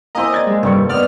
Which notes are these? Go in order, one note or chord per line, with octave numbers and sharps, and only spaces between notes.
A#3 C4 E4 D#5 G#5 A#5
G4 D5 G#6 A6
G#3
F1 G2 D#3 G3 A4 C#6
B2 B3 D5 D#6 F6